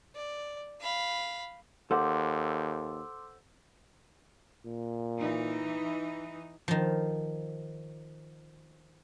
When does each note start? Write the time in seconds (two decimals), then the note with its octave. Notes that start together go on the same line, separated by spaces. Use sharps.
0.15 D5
0.80 F5 B5
1.91 D#2 A4 C5 F#5 C6 D6
4.65 A#2
5.17 E3 D#4
6.68 D#3 F3